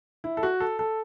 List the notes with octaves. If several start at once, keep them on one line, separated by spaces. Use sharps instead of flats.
E4
A4
F#4
A4
A4